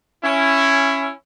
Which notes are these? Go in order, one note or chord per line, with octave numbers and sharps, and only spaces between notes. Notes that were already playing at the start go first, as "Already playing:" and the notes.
C#4 E4